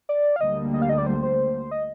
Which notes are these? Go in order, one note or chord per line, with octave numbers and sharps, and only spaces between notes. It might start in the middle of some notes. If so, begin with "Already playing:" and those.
D5
F5
D2 D3 G3 A#3 D#5
D#5
F5
D#5
D5
C5
C5
D#5